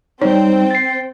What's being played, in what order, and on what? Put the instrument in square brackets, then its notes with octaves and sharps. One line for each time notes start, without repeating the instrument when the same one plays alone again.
[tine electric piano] G3 D#4 [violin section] C4 G5 [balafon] C#5
[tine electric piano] A6 C7